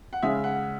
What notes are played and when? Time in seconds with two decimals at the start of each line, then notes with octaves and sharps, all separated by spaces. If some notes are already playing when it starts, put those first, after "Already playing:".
0.13 F#5
0.22 C#3 G#3 C#4 E5
0.44 F#5